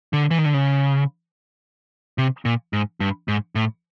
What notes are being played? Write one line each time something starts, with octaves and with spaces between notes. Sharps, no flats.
D3
E3
D#3
D3
C#3
C3
A#2
G#2
G2
G#2
A2